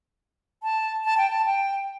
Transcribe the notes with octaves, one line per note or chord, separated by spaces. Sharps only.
A5
A5
G5
A5
G5